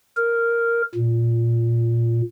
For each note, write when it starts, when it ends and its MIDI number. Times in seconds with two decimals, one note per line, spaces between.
0.17 0.82 70
0.95 2.21 46